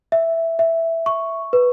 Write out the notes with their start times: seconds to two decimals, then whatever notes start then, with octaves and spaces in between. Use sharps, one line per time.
0.12 E5
0.59 E5
1.06 C#6
1.53 B4